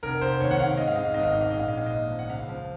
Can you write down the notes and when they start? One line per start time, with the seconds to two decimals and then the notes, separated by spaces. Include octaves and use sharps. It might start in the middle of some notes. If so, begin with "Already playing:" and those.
0.03 F1 A#4
0.21 F1 C5
0.40 D#2 C#5
0.51 F#5
0.59 D#2 F5
0.77 G#2 D#5
0.88 F5
0.96 G#2 D#5
1.05 F5
1.14 G#1 D#5
1.23 F5
1.32 G#2 D#5
1.41 F5
1.50 A#1 D#5
1.59 F5
1.68 D#5
1.73 A#1 F5
1.86 A#2 D#5
2.11 F3
2.19 F#5
2.29 C#2 F5
2.48 F3